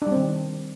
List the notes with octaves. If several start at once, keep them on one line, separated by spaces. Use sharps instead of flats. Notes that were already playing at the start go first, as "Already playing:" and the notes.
D#3 G3 C4 D4